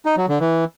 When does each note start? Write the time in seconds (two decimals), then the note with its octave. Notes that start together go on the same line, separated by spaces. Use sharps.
0.05 D#4
0.17 F#3
0.29 D3
0.40 E3